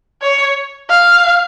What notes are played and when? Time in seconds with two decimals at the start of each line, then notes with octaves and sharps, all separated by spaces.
0.22 C#5
0.90 F5